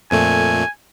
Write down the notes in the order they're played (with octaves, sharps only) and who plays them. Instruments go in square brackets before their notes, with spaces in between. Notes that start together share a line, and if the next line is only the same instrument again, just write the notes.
[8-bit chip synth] F2 A#2 A3 [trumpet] G#5